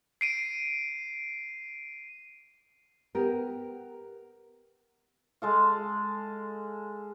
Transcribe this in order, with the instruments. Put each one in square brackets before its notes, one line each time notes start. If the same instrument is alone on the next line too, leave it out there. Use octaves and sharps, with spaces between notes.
[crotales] C7 D7 D#7
[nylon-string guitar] B3 G4 A#4
[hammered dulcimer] G#3 A4 F5